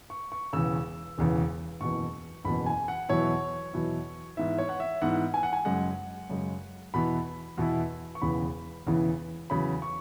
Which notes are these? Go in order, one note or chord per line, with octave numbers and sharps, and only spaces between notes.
C#6
C#6
E1 E2 C#3 E6
E1 E2 C#3
F#1 E2 B2 C#6
F#1 E2 B2 B5
G#5
F#5
E2 B2 F#3 E4 C#5
E2 B2 F#3 E4
G#2 E3 B3 E4 E5
C#5
F#5
E5
G#2 E3 B3 E4 F#5
G#5
F#5
G#5
F#2 C#3 G#3 F#5
F#2 C#3 G#3
E2 B2 B3 E4 B5
E2 B2 B3 E4
C#6
E1 E2 C#3 E3 B3 B5
E1 E2 C#3 E3 B3
E2 C#3 F#3 B5
C#6